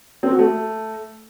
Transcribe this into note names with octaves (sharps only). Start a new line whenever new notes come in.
C4
F#4
A3